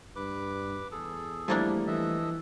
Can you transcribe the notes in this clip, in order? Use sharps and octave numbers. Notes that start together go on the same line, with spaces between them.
G2 B4 D6
E2 G#4 A4
F3 G3 A3 A#3 D4 E4
E3 A4 D#5 E5